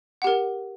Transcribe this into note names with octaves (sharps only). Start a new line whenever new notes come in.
G4 A#4 F#5